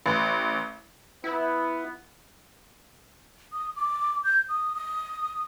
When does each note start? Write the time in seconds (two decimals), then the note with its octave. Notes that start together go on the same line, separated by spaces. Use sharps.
0.06 A1
1.24 B3 E4
3.53 D#6
3.76 D6
4.24 G6
4.49 D#6
4.75 D#6